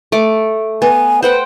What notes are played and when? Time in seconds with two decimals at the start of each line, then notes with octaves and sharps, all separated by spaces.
0.12 A3 D6
0.82 B3 G#5
1.23 B4 C5 F#5 G5